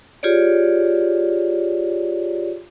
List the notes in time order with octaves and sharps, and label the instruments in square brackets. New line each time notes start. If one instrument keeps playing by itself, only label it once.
[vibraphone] F4 G4 G#4 C#5 D5